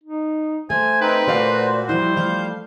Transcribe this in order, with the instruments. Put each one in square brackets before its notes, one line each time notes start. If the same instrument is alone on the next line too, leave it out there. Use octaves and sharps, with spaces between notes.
[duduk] D#4
[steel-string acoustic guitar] A3 [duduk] C5 [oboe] G#5
[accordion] C4 D#4 G5 [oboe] B4
[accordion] A#2 F#4 [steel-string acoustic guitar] A3 D5 F5
[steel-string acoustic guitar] F3 E4 [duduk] G3 [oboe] C5
[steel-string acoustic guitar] F3 A3 [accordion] F5 G6